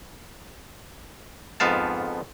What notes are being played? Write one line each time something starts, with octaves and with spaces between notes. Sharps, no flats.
F2 G#2 F3 B3 F5 A5